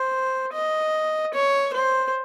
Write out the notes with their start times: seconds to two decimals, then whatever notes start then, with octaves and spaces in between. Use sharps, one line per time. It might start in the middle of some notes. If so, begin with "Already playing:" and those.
Already playing: C5
0.53 D#5
1.34 C#5
1.74 C5